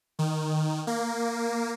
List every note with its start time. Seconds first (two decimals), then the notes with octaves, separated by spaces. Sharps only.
0.19 D#3
0.87 A#3